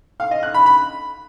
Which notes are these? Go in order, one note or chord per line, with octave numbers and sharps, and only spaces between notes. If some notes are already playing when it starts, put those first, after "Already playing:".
F5
D#5
F#6
B5
B5